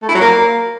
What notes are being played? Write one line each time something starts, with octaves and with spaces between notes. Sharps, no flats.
A3
E4
F#3
A#3